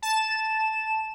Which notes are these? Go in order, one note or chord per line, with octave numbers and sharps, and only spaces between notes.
A5 E7